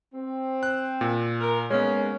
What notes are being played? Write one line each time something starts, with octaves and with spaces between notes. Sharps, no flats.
C4
F#6
A#2
A#4
G#2 G#3 A#3 B3 C#4